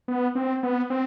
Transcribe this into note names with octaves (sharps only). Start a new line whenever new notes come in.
B3
C4
B3
C4